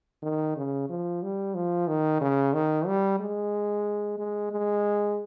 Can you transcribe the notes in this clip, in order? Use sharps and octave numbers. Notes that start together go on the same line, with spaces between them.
D#3
C#3
F3
G3
F3
D#3
C#3
D#3
G3
G#3
G#3
G#3